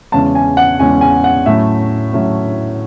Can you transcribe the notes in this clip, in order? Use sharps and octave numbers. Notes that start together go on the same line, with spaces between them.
E2 C#3 G#3 C#4 A5
G#5
F#5
E2 C#3 G#3 C#4 G#5
G#5
F#5
A2 F#3 A3 C#4 E5
A2 F#3 A3 C#4